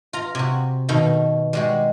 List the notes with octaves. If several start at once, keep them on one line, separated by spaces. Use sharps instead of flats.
F4 A#5
C3 F#4
B2 D#3 A#3 A4
G3 G#3 F#4